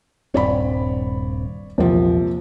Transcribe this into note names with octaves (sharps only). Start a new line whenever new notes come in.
D#1 G2 C4 C#5 D5 B5
A#1 E2 C3 F3 A#3